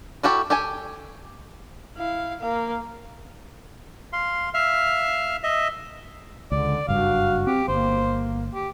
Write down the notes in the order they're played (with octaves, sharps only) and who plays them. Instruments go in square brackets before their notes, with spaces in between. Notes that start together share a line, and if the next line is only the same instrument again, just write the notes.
[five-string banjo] E4 F#4 G4 A4
G4 A4 G5 G#5
[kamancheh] E4 F5
A#3 F5
[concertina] F5 C6
E5 F5 F6
D#5 E5
[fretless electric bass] C#2 [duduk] D3 [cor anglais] D5
[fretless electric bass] F#1 G2 [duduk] F#4 [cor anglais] F5
[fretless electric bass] C4 [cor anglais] G4
[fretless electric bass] G1 [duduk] A#3 [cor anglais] C5
[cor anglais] G4